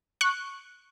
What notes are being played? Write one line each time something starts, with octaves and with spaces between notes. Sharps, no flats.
C#6 F#6